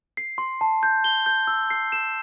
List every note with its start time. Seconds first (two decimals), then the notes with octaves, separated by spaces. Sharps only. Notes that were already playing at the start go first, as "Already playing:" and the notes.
0.17 C7
0.38 C6
0.61 A5
0.83 G6
1.04 G7
1.26 G6
1.47 E6
1.70 C7
1.92 E7